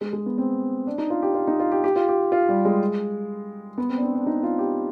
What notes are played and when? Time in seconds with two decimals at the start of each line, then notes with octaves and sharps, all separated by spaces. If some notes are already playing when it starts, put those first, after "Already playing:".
0.01 G#3
0.13 G#3
0.26 B3
0.38 C4
0.87 D4
0.98 D#4
1.10 F4
1.22 G4
1.35 F4
1.47 D#4
1.60 F4
1.72 G4
1.84 G4
1.96 F4
2.08 G4
2.32 F4
2.49 G3
2.65 G#3
3.78 B3
3.90 C4
3.97 D4
4.02 C4
4.15 D4
4.27 D#4
4.43 F4
4.58 G4